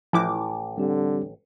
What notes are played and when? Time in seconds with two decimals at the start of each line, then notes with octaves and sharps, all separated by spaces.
0.13 A1 F3 E4 D6
0.78 D3 G3 C4 G4